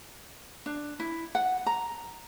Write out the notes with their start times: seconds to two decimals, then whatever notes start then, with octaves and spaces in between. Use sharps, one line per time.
0.66 D4
1.00 E4
1.35 F#5
1.66 A#5